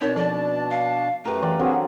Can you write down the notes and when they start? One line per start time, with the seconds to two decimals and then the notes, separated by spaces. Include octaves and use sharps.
0.01 B2 C4 D4 D#4 A#4 C#5 A5
0.16 F3 A4 D5
0.70 F5
1.25 F#2 A3 G4 A#4 B4
1.42 E3 D5 F5 G5
1.59 D3 F#3 C4 C#4 F#4 G#4